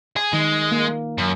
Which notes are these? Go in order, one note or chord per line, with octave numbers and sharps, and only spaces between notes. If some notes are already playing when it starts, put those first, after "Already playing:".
G#4
D#3 G#3
A#3
F#2